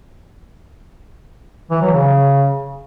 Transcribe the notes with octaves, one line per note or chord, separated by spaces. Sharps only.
E3
F#3
C#3